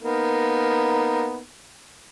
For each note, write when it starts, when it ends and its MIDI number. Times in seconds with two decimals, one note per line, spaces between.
0.02 1.41 58
0.02 1.41 59
0.02 1.41 63